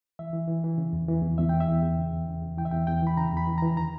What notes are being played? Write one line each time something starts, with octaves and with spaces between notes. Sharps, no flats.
E3 E5
E3
E3
E3
C#3
E2
E3
E2
E2 E5
E3 G5
E5
E2
E2
C#3
E2
C#3
E2
E3 G5
E5
E2 G5
E2 G5
E3 B5
C#3 A#5
E2 B5
E3
E3 A#5
D#3 A#5